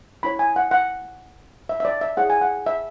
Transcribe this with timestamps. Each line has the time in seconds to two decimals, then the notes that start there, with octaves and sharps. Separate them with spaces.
0.23 C#4 E4 A4 C#5 B5
0.39 G#5
0.56 F#5
0.71 F#5
1.69 E5
1.80 E5
1.85 D5
2.01 E5
2.17 E4 G#4 C#5 F#5
2.30 G#5
2.41 F#5
2.66 E5